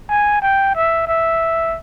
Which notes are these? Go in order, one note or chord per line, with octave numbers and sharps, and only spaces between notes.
G#5
G5
E5
E5